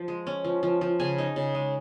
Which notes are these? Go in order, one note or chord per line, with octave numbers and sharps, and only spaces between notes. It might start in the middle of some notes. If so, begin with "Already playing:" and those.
Already playing: F3
G#3
C#4
F3
F3
F3
C#3 G#5
D#4
C#3
G#3